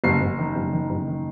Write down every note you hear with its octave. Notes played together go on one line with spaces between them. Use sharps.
F#1 C7
F#1
D#3
F#1
D#3
F#1
D#3